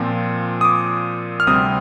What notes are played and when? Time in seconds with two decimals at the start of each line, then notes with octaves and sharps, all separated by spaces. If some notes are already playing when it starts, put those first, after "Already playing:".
Already playing: A#2 F3 C4
0.61 D#6
0.65 D6
1.40 F6
1.47 D2 C3 G3 C4 D#6